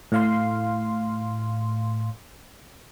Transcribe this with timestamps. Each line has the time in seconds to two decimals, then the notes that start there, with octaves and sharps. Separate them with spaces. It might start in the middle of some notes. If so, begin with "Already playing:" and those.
0.12 A2 F5 C6